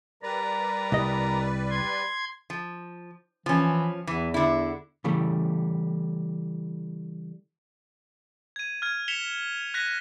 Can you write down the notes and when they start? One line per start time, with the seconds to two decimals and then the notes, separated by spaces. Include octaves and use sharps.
0.23 G3 A#4 B4 D5 A#5
0.92 C2 D#5
1.70 C6 G#6
2.50 F3
3.46 E3 F3 C#4
4.07 E2 E3
4.34 D3 E4
5.04 C#3 E3 G3 A3
8.56 G#6 D#7
8.82 F6 G#6
9.08 B6 C#7 E7 F7 G7
9.74 F#6 G#6 A#6 B6 D#7